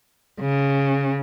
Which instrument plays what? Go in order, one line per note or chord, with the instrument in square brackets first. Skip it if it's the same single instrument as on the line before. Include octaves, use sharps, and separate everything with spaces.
[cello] C#3